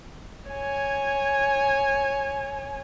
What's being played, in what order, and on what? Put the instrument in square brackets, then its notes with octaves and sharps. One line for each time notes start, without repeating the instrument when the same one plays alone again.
[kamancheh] C#5 G#5